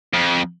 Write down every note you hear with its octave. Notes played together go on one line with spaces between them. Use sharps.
F2